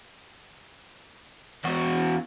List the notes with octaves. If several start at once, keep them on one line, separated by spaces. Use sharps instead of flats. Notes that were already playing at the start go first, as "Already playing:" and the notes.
E2 F#4